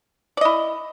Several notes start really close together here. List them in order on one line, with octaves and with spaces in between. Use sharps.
D5 D#5 E4